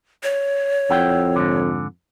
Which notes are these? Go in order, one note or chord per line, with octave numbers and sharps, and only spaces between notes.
C#5
F2 E4 F#5 G5
G#2 D3